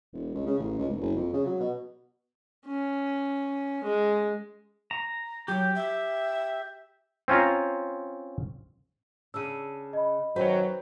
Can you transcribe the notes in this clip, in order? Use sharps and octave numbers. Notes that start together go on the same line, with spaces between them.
E1
C#2
C#3
A1
C#2
F1
F#1
F2
C#3
F#3
B2
C#4
G#3
A#5
F#3 G4
E5
C4 C#4 F4 A#5
C#3 D4 E6 D#7
D#5 B5
F#2 D#3 F#3 B4 C5 G5